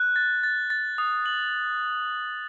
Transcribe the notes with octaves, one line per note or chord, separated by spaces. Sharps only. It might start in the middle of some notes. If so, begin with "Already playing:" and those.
Already playing: F#6
A6
A6
A6
D#6
F#7